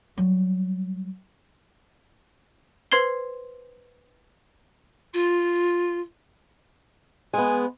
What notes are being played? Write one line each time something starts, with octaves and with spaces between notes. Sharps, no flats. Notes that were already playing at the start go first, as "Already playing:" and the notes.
F#3 G3
B4 C5 C6 G#6 C7 G7
F4
G#3 B3 G#5